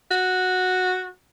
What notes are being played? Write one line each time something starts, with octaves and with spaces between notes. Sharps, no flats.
F#4